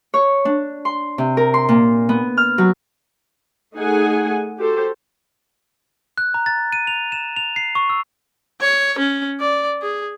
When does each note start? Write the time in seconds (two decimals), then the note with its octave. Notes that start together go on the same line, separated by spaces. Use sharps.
0.14 C#5
0.45 D4
0.85 C6
1.18 C3
1.37 A#4
1.54 C6
1.69 A#2
2.09 B3
2.37 F6
2.58 F#3
3.76 A3 D#4 G#4 F#5 G#5
4.58 F#4 G4 A4 C5
6.18 F#6
6.34 A#5
6.46 A6
6.72 D#7
6.87 F7
7.12 E7
7.36 F7
7.56 C7
7.75 C#6
7.90 E6
8.61 C#5
8.99 C#4
9.40 D5
9.82 G#4